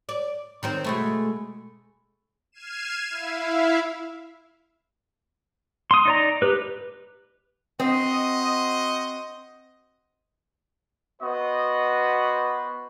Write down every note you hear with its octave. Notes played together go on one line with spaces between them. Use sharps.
D5
D#3 C4 C5
B2 G#3 A3
F6 G#6 C7 D#7 E7
E4 E5 F5
C6 D#6
D#4 D5 A#5
G4 B4
C4 F#4 C5 D#5
B3 F#4 B4 C5 D#5